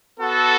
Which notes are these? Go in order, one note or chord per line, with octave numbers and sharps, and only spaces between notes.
B3 F#4 A4